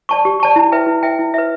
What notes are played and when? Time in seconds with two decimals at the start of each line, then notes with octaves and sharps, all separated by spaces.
0.09 D5 A5 C#6
0.25 G4
0.40 D5 A5 C#6
0.56 E4
0.72 B4 E5 G5
0.87 E4
1.03 B4 E5 G5
1.19 E4
1.34 B4 E5